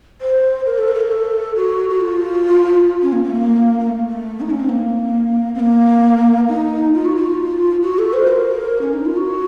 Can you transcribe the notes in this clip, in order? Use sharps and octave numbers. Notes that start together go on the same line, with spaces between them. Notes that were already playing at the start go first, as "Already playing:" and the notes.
C5
A#4
A4
A#4
A4
A#4
A4
F#4
F#4
F4
C#4
A#3
A#3
A3
A#3
A#3
A3
A3
D#4
C#4
C4
A#3
C4
A#3
D#4
F4
F#4
F4
F#4
A4
C5
A#4
C#4
D#4
F4
F#4